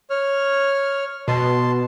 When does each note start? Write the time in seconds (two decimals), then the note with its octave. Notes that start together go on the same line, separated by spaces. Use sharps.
0.10 C#5 F6
1.28 B2 A5 C6